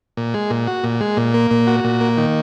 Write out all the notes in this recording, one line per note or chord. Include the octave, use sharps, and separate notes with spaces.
A#2
G#3
A#2
F#4
A#2
G#3
A#2
A#3
A#2
F#4
A#2
A#3
D#3